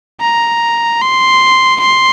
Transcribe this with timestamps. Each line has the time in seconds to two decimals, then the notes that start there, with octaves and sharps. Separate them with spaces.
0.21 A#5
1.01 C6
1.80 C6